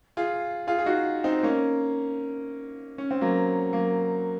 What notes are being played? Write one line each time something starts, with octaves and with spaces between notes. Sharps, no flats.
F4 G#4
F4 G#4
G#4
D#4 F#4
C4 D#4
A#3 C#4
C#4
C4
F#3 A#3
F#3 A#3